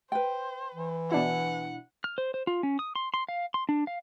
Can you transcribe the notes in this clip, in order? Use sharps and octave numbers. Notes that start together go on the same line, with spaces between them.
B4 C5 G5
E3
B2 D4 E4 F#5
F6
C5
C5
F4
C#4
D#6
C6
C6
F5
C6
D4
F5